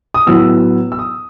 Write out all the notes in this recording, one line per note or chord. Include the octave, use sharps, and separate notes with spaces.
D#6
A2 F#3 B3 E6
E6
D#6